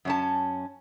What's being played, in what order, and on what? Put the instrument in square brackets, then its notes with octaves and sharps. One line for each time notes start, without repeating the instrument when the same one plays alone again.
[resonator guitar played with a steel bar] F#2 C#4 A5